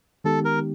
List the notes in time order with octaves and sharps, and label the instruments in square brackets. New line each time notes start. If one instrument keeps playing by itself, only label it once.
[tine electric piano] D#3 G#3 B3 D#4 G4 [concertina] A4
[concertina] A#4